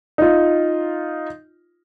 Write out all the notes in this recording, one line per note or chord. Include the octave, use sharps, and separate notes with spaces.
D#4 F4